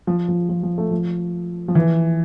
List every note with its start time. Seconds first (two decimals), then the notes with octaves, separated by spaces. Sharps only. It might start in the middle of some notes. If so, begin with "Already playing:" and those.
0.07 F3
0.28 F3
0.49 F3
0.63 F3
0.78 A3
0.91 F3
1.68 F3
1.75 E3